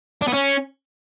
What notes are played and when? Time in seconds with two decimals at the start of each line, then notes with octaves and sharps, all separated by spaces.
0.22 D4
0.28 B3
0.33 C#4